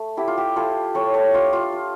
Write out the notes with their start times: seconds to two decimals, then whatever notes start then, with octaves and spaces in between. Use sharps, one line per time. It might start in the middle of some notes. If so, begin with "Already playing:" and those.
Already playing: A3
0.17 E4 G4
0.28 F4
0.38 G4
0.56 E4 F4 A4
0.95 G3 A4 C#5
1.14 A4 C#5
1.34 D4 F4
1.53 F4
1.72 F4